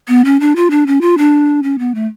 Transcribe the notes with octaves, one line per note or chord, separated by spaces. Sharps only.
B3
C#4
D4
F4
D4
C#4
F4
D4
C#4
B3
A3